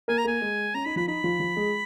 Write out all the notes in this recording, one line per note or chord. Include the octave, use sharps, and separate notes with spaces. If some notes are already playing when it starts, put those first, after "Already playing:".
A#3 A#4 G#5
A#5
A#3 A#4 G#5
G#3 G#4
C#4 A#5
D#4 B5
F3 F4 B5
D#4 B5
F3 F4
F3 F4
G#3 G#4